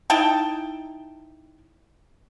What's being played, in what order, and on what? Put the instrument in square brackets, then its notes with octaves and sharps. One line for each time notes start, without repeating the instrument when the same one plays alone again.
[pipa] D#4 E4 G5 A5